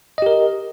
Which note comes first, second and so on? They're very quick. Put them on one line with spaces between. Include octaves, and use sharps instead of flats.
D#5 G4 A#4